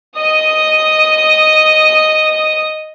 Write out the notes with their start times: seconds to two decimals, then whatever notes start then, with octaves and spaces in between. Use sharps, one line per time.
0.18 D#5 D#6